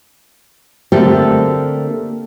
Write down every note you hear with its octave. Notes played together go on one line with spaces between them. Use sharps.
D3 A3 A#3 C4 G4 A4